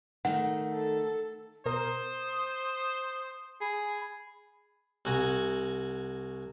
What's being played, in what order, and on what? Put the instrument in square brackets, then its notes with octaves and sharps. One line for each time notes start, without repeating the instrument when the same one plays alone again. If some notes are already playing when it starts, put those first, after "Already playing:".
[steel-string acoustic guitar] D#3 A3 [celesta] F#5
[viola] A4
[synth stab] B2 A#4 [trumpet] C5 [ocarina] D#6
[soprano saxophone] G#4 [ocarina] B5
[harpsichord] C2 F#4 G#5 A#5 C#6